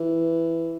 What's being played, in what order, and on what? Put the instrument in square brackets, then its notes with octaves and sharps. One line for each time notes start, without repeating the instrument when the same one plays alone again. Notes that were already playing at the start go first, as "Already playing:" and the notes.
Already playing: [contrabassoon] E3